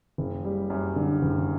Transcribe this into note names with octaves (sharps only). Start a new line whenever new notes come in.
F#1
G3
F#2
D3
F#1